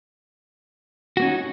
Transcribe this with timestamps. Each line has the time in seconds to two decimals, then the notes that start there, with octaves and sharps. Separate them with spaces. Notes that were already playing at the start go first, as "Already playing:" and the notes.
1.17 F#4
1.20 A#3
1.22 C#4
1.25 D#4